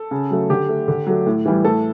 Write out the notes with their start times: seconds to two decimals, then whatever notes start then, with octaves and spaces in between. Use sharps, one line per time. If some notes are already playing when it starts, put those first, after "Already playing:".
Already playing: A4
0.11 C#3
0.31 F#3 A3
0.50 D3 G4
0.69 A3
0.88 D3
1.07 F#3 A3
1.26 A2
1.46 E3 G3
1.65 A2 A4